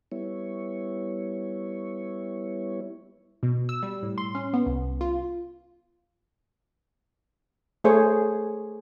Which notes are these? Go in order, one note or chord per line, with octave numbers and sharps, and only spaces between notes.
G3 B3 E4 C#5
B2
E6
G3
A2
C6
C#4
B3
C2
F4
A3 G#4 C5 C#5